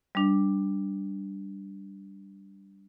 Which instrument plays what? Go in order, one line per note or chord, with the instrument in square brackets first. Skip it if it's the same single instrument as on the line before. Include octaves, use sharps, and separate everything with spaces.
[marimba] G3 D4